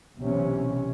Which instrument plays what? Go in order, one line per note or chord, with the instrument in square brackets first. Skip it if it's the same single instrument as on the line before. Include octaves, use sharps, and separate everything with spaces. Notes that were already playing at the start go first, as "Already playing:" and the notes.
[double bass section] B1 C3 E3 C#4